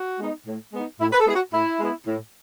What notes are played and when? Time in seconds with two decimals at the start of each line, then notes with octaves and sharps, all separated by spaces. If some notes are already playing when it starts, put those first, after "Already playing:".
Already playing: F#4
0.20 G#3 B3 D#4
0.47 A2
0.73 G#3 B3 D#4
1.00 A2 E4
1.13 B4
1.20 A4
1.26 G#3 B3 E4 G#4
1.35 F#4
1.53 A2 E4
1.80 G#3 B3 E4
2.06 A2